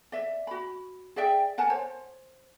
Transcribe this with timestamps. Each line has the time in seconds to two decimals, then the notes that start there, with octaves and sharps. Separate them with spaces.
0.12 D5 E5
0.47 F#4 B5
1.16 G#4 D5 E5 G5
1.58 A#4 F#5 G#5 A5
1.70 C5 C#5